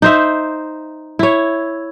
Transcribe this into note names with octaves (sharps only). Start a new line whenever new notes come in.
D#4 C5 E5
E4 C#5